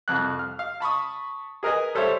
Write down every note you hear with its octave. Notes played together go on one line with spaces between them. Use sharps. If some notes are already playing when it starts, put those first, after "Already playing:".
C2 F2 F#6
F6
F5
A5 B5 C#6 D#6
G#4 A#4 B4 D#5 G#5
G3 A4 C5 C#5 E5